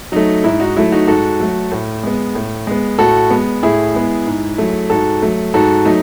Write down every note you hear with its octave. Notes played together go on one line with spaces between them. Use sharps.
F#3 A3 D#4
G#2 E4
D#4 F#4
F#3 A3 E4
D#4 F#4
G#2 F#4 A4
F#3 A3
A2
G#3 B3
A2
G#3 B3
A2 F#4 A4
G#3 B3
A2 E4 G#4
G#3 B3
G#2
F#3 A3
G#2 F#4 A4
F#3 A3
G#2 F#4 A4
F#3 A3 D#4